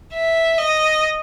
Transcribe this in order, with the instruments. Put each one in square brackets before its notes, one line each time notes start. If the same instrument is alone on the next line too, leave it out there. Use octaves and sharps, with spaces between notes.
[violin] E5
D#5